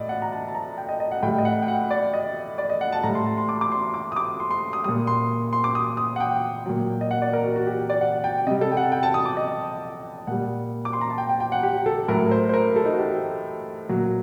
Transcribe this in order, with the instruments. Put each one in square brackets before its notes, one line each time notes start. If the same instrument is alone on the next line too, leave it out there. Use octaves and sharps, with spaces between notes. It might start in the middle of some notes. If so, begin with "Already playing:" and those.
Already playing: [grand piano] A2 D5 D#5
F#5
A#5
A5
A5
A#5
G5
D#5
D#5
F#5
A2 G3 G5
D#5
F#5
G5
F#5
D5
D#5
D5
D#5
F#5
A5
A2 G3 A#5
C6
A5
C6
D6
D6
C6
D6
D#6
D6
C6
C6
D#6
A#2 G3 D#6
C6
C6
D6
D#6
D#6
F#5
G5
A#2 F#3
D#5
F#5
D5
A#4
F#4
F#4
G4
G4
D5
F#5
G5
C3 G3 D#5
A4
G5
F#5
G5
A5
D#6
D6
D#5
A#2 G3 F#5
D6
C6
A#5
A5
G5
G5
G5
F#5
G4
A4
A2 F#3 A#4
C5
C5
A#4
A4
D#4
F#4
G4
A#2 F#3 F#4